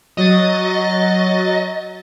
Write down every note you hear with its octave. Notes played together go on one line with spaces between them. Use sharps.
F#3 D#5 A6